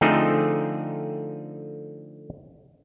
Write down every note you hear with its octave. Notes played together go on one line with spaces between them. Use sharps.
D3 F3 A3 C4 D#4 G#4